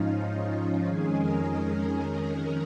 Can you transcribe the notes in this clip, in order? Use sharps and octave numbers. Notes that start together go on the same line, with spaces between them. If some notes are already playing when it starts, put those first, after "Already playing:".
Already playing: G#2 F3 C#4 D#4 F4
F4
F2 D#3 G#3 C#4 G#4
A#4